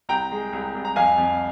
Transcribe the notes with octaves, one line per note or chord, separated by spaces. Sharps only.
C2 G5 A#5
G#3
C2
C2
A#5
F2 F5 G#5
F2